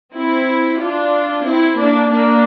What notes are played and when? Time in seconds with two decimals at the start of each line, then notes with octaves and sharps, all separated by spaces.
0.13 C4 E4
0.79 D4 F4
1.45 C4 E4
1.78 A#3 D4
2.11 A#3 D4